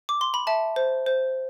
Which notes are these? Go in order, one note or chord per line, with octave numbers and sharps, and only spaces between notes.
D6
C6
B5
E5 A5
C5
C5